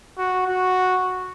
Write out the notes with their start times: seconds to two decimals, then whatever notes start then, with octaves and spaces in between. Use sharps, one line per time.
0.18 F#4
0.47 F#4